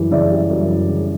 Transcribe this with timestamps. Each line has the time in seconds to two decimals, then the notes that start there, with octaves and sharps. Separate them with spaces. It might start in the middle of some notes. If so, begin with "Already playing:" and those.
Already playing: F#2 C#3 E3 G3
0.11 C#3 D5 E5
0.31 G3
0.51 F#2
0.69 E3
0.88 C#3